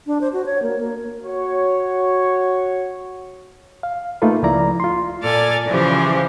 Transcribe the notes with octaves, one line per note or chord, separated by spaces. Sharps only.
D4
C5
F#4
C#5
A#3
A#3
F#4 C#5
F5
A3 A#3 D#4 F4 A4 B4
C#2 F3 E4 D5 A#5
F4 C6
A#2 A4 D5 G#5 F6 A6
C#3 E3 F3 G4 G#4 C5